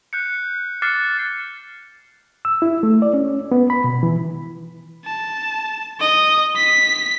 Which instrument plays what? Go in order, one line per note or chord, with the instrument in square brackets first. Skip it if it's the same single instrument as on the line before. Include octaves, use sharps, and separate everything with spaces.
[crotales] F#6 G6 C#7
D6 F6 F#6 A6 C7 C#7
[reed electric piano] E6
E4
A3
D5
C#4
B3
B5
B2
E3
[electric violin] A5
D#5
B6